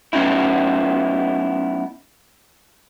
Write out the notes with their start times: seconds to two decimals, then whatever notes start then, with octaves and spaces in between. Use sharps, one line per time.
0.13 F#3 A3 B3 C#4 D#4 E4